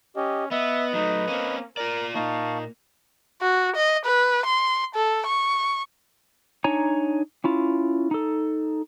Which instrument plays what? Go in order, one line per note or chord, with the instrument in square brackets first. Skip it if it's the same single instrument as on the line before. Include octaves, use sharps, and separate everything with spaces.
[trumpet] C#4 [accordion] G4 D#5
[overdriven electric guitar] B3 [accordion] B4 D#5 B5 [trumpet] E5
[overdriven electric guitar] F#3 A3 [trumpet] D#4
[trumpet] A#3 [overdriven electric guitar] C4 C#4
[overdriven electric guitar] F4 D5 [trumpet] A#4
[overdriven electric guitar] A#2 A#3 [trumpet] D#4 [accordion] F5 A5 C#6
[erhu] F#4
D#5
B4
C6
A4
C#6
[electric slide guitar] D4 D#4 C#5 G#5 A#5
C#4 E4 F4
D#4 A4